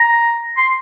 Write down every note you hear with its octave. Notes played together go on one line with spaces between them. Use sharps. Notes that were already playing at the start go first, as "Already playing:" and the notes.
Already playing: A#5
C6